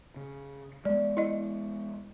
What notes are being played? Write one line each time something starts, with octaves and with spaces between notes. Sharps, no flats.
C#3
G#3 B3 D5
E4 D#5